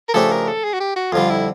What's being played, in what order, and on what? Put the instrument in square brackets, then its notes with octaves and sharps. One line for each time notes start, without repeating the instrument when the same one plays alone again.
[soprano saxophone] A#4
[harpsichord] C#3 F3 A3 D4 G4 [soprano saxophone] A4
[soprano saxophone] A#4
A4
G#4
F#4
G4
F#4
[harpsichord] F2 D3 G3 [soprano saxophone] F4
[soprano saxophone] E4